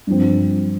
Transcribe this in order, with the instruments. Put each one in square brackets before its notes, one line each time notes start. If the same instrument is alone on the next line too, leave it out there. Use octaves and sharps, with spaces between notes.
[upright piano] G2 F3 C4